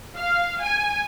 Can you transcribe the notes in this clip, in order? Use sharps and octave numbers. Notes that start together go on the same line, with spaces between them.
F5
G#5